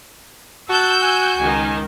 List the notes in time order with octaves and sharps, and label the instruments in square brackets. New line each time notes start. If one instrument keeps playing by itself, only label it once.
[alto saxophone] F#4 [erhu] A5 [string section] E6 F#6 G6
[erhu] G#5
[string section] C#2 D#3 [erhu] G#5